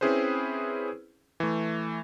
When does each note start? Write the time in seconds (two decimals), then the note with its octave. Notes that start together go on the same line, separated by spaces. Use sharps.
0.01 C4 C#4 E4 G#4 B4 C5
1.40 E3 A3